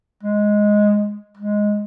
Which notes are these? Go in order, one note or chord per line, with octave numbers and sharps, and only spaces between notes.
G#3
G#3